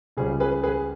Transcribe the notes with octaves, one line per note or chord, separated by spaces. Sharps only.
C#2 C#3 G3 C#4 G#4
G#4 B4
G#4 B4